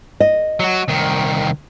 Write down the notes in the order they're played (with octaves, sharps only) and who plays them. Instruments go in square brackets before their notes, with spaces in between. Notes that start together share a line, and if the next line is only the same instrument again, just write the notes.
[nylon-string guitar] D#5
[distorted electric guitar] F#3 F#4
C2 D#3